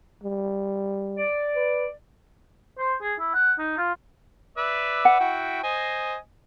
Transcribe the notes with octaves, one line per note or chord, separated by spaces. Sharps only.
G3
D5
B4
C5
G#4
E4
F#5
D#4
F4
B4 D5 E5
F#5
E4 F#4 G5
C5 D#5 G#5